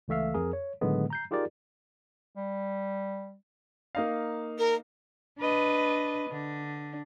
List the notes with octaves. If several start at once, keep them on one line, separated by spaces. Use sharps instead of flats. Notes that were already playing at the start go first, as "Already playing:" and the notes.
C#2 E3 A3 E5 F5
F2 G#4 A#4
C#5
A2 D3 D#3 F#3 G#3 B3
A#5 G6 C7
D#4 F4 G4 G#4 A#4 D5
G3
A#3 D#4 F5
A#4
D4 B4 D#5
D3 D4